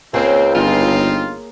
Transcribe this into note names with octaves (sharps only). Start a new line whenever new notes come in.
C#2 A#3 C4 G#4 C#5
G1 C4 D#4 F4